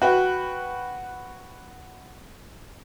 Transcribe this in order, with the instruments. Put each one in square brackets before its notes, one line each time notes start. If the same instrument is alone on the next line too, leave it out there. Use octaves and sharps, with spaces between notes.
[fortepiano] F#4 B4 G5